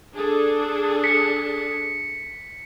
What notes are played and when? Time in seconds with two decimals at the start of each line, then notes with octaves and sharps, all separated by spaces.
0.13 D4 G#4 A4
1.04 B6 C#7